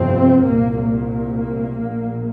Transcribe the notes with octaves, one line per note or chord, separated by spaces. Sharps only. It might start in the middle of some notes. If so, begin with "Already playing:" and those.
Already playing: G1 F2 C3 C4
C2 A#2 A#3
A#3
A#1 A#2